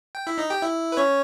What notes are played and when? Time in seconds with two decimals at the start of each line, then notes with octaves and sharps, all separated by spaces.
0.15 G5
0.27 E4 E5
0.38 D#4 D#5
0.49 G4 G5
0.62 E4 E5
0.92 B4
0.97 C#4 C#5